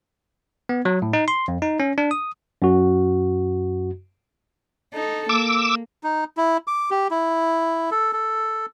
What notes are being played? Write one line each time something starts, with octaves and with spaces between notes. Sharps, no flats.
B3
F#3
A2
D#4
C6
F2
D#4
C#4
D4
D#6
F#2 F#4
D#4 A4
A#3 D6 E6
D#4
E4
D6
G4
E4
A4
A4